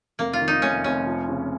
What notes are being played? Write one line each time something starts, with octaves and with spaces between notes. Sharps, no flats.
F1 A#3
F4
D#3
D#4
F1 C#4
F1 C#4
F3
C#3